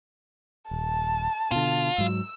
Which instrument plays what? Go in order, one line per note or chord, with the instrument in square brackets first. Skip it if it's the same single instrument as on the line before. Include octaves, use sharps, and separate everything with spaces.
[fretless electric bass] D#1 [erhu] A5
[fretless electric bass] B2 D3 [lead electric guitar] F4
[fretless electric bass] G#2 F#3 [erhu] E6